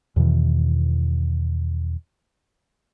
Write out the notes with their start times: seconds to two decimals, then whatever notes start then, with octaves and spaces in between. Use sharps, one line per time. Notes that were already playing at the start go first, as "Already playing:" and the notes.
0.16 E2 B2 D#3 E3